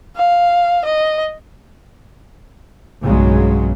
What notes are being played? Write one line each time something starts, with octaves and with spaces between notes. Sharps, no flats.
F5
D#5
B1 G2 C#3 F#3 G#3